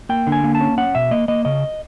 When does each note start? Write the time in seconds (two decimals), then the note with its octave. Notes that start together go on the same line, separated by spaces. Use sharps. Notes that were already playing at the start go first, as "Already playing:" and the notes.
0.09 A#3 G5
0.27 D3
0.32 G#5
0.44 A#3
0.55 A5
0.61 C#4
0.78 C#4 F#5
0.95 B2 E5
1.11 A#3 D#5
1.28 A#3 D#5
1.45 C#3 D#5